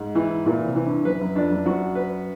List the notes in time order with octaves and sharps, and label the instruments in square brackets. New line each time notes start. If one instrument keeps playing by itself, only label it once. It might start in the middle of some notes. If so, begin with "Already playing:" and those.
Already playing: [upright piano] G#2
[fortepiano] E3
[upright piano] A#2 [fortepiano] E3
[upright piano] C3
[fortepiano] E3
[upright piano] G2
[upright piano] F#2 [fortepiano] B4
[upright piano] F#2
[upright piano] F2 [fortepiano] D4
[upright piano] F#2
[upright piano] F#2 [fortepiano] F#4
[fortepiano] B4